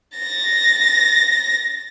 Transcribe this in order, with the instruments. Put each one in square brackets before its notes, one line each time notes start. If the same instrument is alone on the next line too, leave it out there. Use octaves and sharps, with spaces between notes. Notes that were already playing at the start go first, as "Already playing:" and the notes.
[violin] A6 A#6